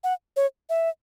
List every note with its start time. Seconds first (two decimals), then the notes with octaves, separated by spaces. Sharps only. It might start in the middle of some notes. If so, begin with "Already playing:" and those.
0.04 F#5
0.36 C#5
0.70 E5